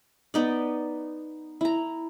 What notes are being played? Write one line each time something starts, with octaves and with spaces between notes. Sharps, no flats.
B3 D#4 D5
E4 A#5